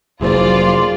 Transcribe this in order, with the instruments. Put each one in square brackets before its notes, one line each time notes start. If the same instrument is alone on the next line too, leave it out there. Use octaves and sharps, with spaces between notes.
[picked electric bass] F1 F#3 A#3 [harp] E4 G#4 C5 [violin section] F4 D5